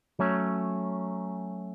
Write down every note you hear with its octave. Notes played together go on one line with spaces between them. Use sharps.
F#3 A3 C#4